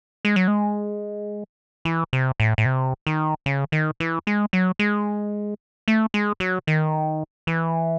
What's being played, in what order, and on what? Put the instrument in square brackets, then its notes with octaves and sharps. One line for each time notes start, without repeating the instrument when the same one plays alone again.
[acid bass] G#3
F#3
G#3
E3
C3
A2
A2
C3
D#3
C#3
D#3
E3
G#3
F#3
G#3
A3
G#3
F#3
D#3
E3